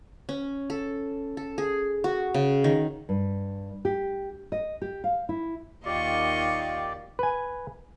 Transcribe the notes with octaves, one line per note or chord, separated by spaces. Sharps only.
C#4
A4
A4
G#4
F#4
C#3
D#3
G2
G4
D#5
G4
F5
E4
D#2 D#3 F4 G4 D5 D#5 C#6
B4 G#5